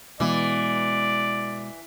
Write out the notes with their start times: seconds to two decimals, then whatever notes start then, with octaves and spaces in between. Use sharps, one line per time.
0.20 B2 E3 G#3 B3 D5